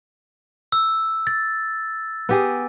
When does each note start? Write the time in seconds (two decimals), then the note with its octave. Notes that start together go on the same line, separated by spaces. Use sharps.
0.72 E6
1.27 A6
2.29 B3 G4 G#4